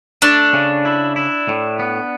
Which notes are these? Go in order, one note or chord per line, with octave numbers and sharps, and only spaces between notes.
A3 D4
C#3
E4
E4
A2
B3